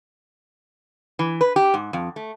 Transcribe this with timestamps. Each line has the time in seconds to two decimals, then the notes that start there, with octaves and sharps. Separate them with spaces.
1.19 E3
1.41 B4
1.56 G4
1.74 G#2
1.93 F2
2.16 A3